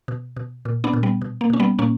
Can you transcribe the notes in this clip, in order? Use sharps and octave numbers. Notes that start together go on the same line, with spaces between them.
B2
B2
A#2
B3 D4
A#2
G3 B3
B2
A#3
B2 C#4
G3 B3
A#2 A#3 C#4